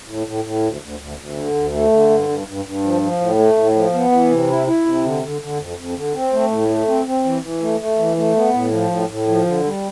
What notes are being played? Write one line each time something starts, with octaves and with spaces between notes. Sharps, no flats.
A2
A2
A2
D2
D2
D2
D2
D3
D2
A3
D3
G2
G2
G2
G2
F3
F3
A2
A3
A2
F3
B3
E3
C3
E4
E4
C3
D3
D3
D3
F2
F2
D3
C4
A3
A2
A3
C4
C4
E3
E3
A3
A3
E3
A3
B3
A2
F3
A2
A2
F3
D3
G3